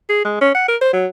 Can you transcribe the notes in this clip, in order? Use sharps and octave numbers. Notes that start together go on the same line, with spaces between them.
G#4
G#3
C#4
F#5
A#4
C5
F#3